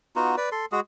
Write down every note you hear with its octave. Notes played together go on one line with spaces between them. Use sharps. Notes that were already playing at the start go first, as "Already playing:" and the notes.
B3 D#4 F4 F#4
B4 D5
A4 C6
G#3 F#4 G#4